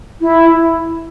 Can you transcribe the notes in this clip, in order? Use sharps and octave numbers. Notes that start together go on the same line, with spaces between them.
E4